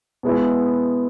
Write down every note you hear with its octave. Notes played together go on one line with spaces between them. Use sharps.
B2 G#3 B3 E4